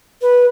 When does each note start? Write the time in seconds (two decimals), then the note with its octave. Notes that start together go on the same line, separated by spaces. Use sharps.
0.21 B4